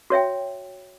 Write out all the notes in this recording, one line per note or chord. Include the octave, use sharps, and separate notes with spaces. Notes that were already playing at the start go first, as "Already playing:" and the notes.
F#4 C#5 E5 G5